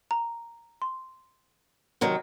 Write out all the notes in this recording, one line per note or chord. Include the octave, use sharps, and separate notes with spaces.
A#5
C6
C3 D#3 F#3